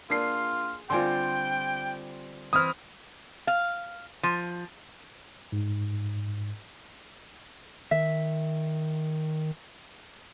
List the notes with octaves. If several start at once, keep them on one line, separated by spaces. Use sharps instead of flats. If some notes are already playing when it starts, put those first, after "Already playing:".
A#3 D4 F4 G#4 C7
D3 G3 C4 F4 G5 G#5 C6
E3 C4 E4 D#6 F6
F5
F3
G#2
D#3 E5